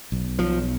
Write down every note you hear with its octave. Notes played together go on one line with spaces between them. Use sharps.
B1
B1 F3